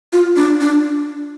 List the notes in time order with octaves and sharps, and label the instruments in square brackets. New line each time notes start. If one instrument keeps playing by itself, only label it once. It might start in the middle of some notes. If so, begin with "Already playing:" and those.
[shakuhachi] F4
D4
D4